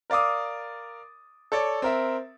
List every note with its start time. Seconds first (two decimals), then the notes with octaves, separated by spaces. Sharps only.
0.10 A#4 D5 F5 D6 D#6
1.52 A4 C#5 D5
1.82 C4 A#4 E5